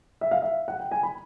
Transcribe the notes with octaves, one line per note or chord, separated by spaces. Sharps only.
E5
F5
E5
F#5
G5
G#5
B5